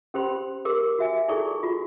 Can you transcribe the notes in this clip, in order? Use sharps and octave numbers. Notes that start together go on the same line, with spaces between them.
C#4 G4 C5 B5 C6
G4 A#4 D6 E6
F#4 E5 G#5
D#4 E4 G#4 A4 D5 C#6
F4 F#4